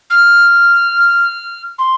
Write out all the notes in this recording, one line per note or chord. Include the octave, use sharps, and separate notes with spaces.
F6
C6